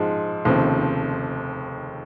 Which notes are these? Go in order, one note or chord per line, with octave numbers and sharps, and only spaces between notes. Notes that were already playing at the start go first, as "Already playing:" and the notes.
Already playing: G#2 F3 G#3
F1 D#2 C#3 F3 C4